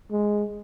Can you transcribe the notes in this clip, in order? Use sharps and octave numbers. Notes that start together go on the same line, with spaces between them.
G#3